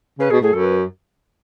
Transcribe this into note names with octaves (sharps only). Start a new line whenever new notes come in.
C#3 B4
B2 G#4
A2 G#4
F#2 A4
B4